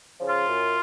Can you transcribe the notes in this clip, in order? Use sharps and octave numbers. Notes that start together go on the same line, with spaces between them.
C#3 F3
F4
F#2